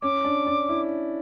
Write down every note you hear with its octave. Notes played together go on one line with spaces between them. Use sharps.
C#4 D6
D4
D4
E4